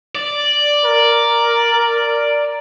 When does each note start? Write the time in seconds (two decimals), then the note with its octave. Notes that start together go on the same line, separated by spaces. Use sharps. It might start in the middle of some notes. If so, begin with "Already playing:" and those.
0.15 D5
0.85 A#4